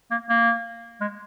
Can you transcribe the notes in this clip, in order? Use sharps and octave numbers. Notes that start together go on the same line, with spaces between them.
A#3
A#3
G#3